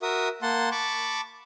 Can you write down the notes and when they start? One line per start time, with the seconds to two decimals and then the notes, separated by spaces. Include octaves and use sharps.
0.02 F#4 A#4 E5 D#6
0.42 A#3 F#5 A5 C6
0.71 A5 B5 C#6 D6